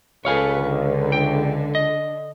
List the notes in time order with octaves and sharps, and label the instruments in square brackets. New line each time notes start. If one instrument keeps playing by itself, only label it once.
[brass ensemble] C#2 [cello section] A4 B4 [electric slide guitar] C#5 F5 G#5
[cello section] D3
[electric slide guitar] G5
D#5